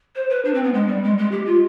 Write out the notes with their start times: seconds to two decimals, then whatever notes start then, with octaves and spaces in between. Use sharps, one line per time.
0.16 C5
0.30 B4
0.45 D4
0.54 C4
0.64 B3
0.74 G#3
0.88 G3
1.03 G#3
1.18 G#3
1.32 G4
1.46 F4